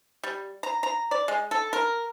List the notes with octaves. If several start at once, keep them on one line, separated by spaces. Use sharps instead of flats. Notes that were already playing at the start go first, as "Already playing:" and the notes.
G3
A#5
A#5
D5
G#3
A4
A#4